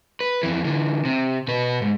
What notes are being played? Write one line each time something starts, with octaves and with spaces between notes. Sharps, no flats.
B4
F2 E3
D3 E3
C3
B2 B4
G#2